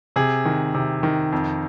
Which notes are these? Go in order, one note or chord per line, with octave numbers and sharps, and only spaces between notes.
C3 G#4
D#3
C3
D#3
F2